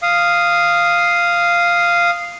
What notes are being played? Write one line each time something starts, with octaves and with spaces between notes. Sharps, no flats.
F5 D#6